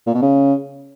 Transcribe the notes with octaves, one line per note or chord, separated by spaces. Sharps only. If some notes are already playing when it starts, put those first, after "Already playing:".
A#2
B2
C#3